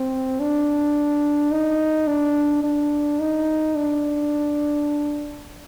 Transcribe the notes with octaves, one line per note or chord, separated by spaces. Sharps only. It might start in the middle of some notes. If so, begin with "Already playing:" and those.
Already playing: C4
D4
D#4
D4
D4
D#4
D4